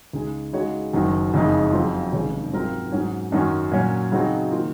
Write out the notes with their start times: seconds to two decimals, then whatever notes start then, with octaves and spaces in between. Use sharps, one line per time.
0.13 C#2 C#3 G#3 D#4 G#4
0.53 C#3 G#3 D#4 F#4 C#5
0.93 F#1 F#2 D#3 F#3
1.34 F#1 F2 C#3 G#3 D#4
1.72 F2 C#3 F#3 C4 F4
2.12 F1 D#2 C#3 G#3 C#4
2.53 G#2 F#3 C4 F4 A#4
2.92 G#2 F#3 C#4 G#4
3.32 F#2 D#3 F#3 C#4
3.71 A#2 F#3 C#4
4.12 C#3 F#3 C4 D#4 F#4
4.52 D#3 A#3 F4